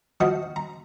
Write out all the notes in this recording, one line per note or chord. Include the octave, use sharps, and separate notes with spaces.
F3 F#4 D#5
A#5